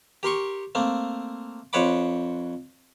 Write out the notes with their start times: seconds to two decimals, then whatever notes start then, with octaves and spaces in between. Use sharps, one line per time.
0.23 G4 A#4 C6 C#6
0.75 A3 A#3 C4
1.73 F2 C5 C#5 F#5 B5 D6